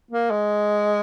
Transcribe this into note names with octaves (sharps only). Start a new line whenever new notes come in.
A#3
G#3